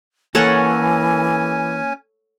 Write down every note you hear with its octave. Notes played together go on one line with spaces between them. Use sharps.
E3 A#3 C#4 A4 C#5 F#5 G#5